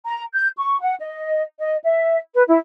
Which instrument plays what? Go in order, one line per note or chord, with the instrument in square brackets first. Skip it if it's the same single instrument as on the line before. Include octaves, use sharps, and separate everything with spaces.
[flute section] A#5
G6
C#6
F#5
D#5
D#5
E5
B4
E4